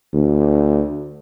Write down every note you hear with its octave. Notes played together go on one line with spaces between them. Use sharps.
D2